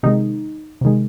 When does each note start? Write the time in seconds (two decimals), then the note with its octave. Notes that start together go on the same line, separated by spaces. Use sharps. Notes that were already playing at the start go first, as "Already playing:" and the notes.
0.03 C3 D#3 G#3 D#4
0.81 C3 D#3 G#3